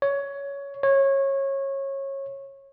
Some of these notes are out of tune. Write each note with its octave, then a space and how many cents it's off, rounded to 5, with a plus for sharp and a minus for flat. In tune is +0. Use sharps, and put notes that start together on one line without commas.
C#5 +15
C#5 -20